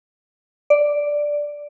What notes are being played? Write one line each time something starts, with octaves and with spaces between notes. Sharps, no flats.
D5